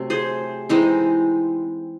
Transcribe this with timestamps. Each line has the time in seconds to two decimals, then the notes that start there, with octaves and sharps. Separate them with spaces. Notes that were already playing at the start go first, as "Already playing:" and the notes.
Already playing: C3 F#3 A3 C4
0.10 G#4 C5
0.69 E3 G#3 C4 D#4